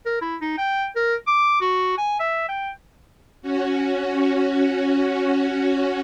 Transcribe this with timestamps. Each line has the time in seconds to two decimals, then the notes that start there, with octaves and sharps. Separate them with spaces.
0.06 A#4
0.22 E4
0.41 D#4
0.58 G5
0.96 A#4
1.27 D6
1.61 F#4
1.98 G#5
2.20 E5
2.49 G5
3.42 C#4 F#4